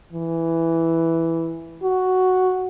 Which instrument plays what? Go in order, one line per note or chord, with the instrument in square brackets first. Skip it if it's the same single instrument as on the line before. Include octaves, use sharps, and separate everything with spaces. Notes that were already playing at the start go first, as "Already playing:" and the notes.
[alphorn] E3
F#4